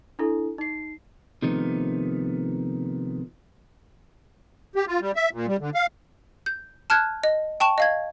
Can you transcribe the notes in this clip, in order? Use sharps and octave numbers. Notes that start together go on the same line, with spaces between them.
D4 E4 A4
D#4 C7
C3 D#3 F3 A3 B3 D#4
G4
F4
G3
E5
A#2
G3
D3
F5
G6
A5 F6 F#6 G#6
D#5
G5 A5 C#6 E7
D#5 F5 G#6